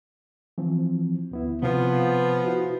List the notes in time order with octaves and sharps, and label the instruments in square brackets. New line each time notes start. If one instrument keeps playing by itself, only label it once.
[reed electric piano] E3 F3 C4
D2 B3 E4
[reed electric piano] C3 [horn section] F3 B3
[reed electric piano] E4 F#4